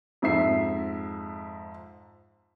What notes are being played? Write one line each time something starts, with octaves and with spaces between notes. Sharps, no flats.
F2 G#2 E5 C7